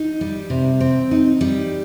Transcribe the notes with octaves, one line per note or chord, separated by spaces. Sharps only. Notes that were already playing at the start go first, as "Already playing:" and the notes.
Already playing: D#4
G3
C3
C4
D#4
G3